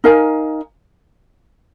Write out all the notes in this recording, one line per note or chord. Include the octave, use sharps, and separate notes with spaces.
D#4 A#4 F5 G#5